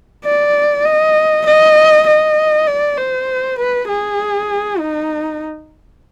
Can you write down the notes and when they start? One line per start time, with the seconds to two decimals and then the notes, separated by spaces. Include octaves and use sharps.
0.25 D5
0.85 D#5
1.46 D#5
2.07 D#5
2.67 D5
2.98 C5
3.59 B4
3.88 G#4
4.80 D#4